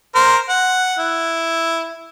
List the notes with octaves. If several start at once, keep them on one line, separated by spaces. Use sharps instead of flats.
A#4 C5
F#5
E4